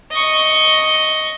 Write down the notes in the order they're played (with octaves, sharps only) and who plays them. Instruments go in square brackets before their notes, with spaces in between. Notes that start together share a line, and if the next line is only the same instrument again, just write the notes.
[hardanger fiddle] D#5 C#6